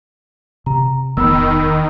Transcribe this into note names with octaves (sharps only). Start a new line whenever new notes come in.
C3 A#5
D1 E2 D#3 B3 B5 E6